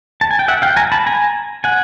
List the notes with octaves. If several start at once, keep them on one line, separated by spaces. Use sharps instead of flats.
A5
G#5
G5
E5 F#5
F5 G5
G#5 A#5
A5 B5
G#5 A#5
F#5 G#5